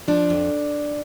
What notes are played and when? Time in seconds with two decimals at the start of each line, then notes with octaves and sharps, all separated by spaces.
0.08 F3 D4
0.30 F2